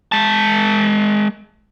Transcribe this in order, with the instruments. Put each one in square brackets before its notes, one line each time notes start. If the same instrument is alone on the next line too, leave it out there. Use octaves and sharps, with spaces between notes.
[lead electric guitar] G#3 A5